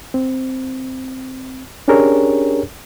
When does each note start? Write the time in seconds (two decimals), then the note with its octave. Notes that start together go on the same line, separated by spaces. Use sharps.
0.14 C4
1.88 C#4 D4 G4 G#4 A#4 C#5